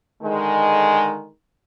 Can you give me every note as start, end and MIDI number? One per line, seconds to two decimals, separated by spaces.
0.23 1.27 50
0.23 1.27 51
0.23 1.27 56